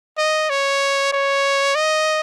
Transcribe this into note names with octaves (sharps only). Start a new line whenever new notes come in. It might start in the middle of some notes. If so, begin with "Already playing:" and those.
D#5
C#5
C#5
D#5